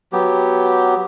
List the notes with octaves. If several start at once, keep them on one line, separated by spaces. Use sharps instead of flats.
F#3 B3 G4